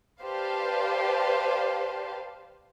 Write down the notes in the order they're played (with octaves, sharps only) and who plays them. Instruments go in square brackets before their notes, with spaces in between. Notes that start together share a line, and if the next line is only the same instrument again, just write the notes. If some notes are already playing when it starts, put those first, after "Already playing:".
[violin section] G4 B4 C5 D5 F5 A5